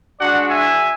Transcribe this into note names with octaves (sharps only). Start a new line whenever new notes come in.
G#3 D4 F#4 D5 F#5
E5 G#5